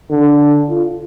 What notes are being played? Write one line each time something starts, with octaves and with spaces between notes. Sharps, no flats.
D3
F4